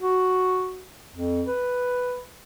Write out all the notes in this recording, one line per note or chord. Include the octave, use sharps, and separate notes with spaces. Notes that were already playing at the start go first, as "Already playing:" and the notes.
F#4
F2
B4